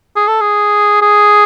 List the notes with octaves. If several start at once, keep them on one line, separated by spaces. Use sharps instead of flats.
G#4
A4
G#4
G#4